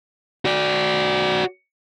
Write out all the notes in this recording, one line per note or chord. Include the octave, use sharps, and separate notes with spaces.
F#4 D5